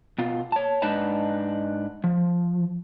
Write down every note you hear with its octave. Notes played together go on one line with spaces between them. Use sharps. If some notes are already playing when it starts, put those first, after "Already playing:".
B2 F4
C#5 A5
G#2 D4 D#4 B4 A5
F3